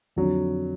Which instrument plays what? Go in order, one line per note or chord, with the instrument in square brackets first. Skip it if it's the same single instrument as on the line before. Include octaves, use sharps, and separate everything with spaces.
[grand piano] F2 D3 F#3